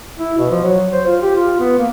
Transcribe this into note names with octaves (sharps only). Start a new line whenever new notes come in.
E4
B2
F3
F#3
C5
F4
G4
F4
B3
A#3